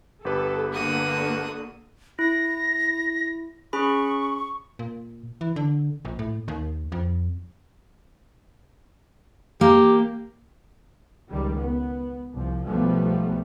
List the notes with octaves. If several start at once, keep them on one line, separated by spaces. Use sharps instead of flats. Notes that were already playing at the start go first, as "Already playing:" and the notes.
G1 G4 A4 B4
D3 A#3 F#4 D#6
E4 A#6
C#4 G#4 B5 C#6
A#2
E3
D3
A#1
A2
D#2
F2
A#3 G4
C#2 D#3 G3
B3
C2 F3
B1 F3 G3 A3 B3